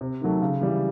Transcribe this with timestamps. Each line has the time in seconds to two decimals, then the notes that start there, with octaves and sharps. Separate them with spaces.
0.01 C3
0.21 D#3 F#3 A3
0.42 C#3
0.61 E3 G3